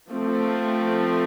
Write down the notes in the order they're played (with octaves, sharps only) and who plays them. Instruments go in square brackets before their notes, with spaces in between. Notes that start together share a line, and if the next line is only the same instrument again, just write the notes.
[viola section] F3 A3 C4